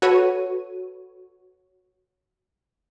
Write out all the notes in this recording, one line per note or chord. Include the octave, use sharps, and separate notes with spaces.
F#4 A4 B4 C#5 D#7